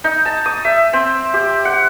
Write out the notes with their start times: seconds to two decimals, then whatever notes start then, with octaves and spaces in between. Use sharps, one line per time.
0.04 D#4
0.25 A5
0.46 D#6
0.65 E5
0.93 C4
1.34 G4
1.65 F#5